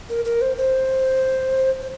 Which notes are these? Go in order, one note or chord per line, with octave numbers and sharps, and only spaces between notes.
A#4
A#4
C5
C5
C5